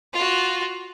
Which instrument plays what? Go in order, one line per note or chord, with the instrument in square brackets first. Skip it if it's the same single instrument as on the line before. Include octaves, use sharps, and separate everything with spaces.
[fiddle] F4 F#4